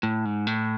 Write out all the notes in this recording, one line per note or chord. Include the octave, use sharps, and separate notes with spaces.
A2
G#2
A2